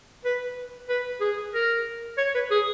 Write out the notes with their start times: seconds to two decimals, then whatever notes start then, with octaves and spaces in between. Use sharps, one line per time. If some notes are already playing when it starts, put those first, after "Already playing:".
0.25 B4
0.89 B4
1.21 G#4
1.54 A#4
2.18 C#5
2.34 B4
2.51 G#4